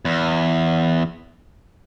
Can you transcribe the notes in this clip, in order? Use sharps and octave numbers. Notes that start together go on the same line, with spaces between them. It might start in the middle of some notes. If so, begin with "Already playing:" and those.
E2